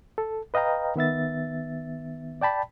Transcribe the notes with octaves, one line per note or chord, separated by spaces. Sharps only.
A4
B4 D#5 F5 G5 A#5
D#3 B3 E5 A6
D5 G5 A5 B5